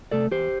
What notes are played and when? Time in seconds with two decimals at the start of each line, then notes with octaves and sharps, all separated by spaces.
0.11 C3 A3 A4 D5
0.31 E2 G4 C5